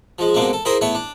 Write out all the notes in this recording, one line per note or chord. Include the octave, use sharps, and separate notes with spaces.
F3 G#3
B2 D3 G#3 A#3 C4
A4
E4 G#4 A#4 C5 A#5 D#6
A3 B3 E4 C#5
D4